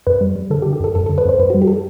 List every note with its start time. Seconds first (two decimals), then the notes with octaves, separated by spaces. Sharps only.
0.07 F#2 B4
0.21 G3
0.36 G3
0.50 D3 A4
0.62 G4
0.66 D3
0.73 G4
0.80 F#2 A4
0.95 F#2 A4
1.06 A4
1.09 D3
1.18 B4
1.25 F#2 C5
1.39 F#2 B4
1.50 F#4
1.54 G3
1.62 G4
1.67 A4
1.73 G4